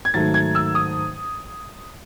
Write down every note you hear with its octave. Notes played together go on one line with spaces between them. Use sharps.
G#6
G#2 D#3 F#3 A3 A6
G#6
E6
D#6